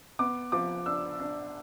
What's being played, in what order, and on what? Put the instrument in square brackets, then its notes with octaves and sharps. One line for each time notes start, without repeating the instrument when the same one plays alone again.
[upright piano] B3 D6
F3 D6
D4 E6
D4